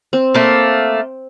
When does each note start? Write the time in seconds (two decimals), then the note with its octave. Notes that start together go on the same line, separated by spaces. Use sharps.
0.13 C4
0.34 A3 A#3